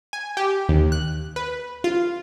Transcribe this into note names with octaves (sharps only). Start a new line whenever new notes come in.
G#5
G4
D#2
F#6
B4
F4